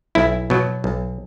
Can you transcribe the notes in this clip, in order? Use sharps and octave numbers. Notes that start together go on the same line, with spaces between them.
B1 E4
B2 F#3
B1